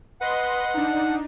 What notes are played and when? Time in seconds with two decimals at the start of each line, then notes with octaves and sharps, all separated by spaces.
0.21 B4 D#5 F#5 C6
0.74 D4 D#4